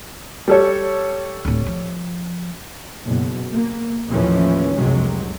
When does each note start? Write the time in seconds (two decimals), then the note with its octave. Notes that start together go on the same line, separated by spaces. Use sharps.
0.48 G3 A4 C#5
1.45 D1 A2
1.66 F3
3.03 F#1 B2
3.53 A#3
4.08 D#2 A2 E3 F3 A3 C#4
4.75 F1 C2 G2 C3 F#3 G#3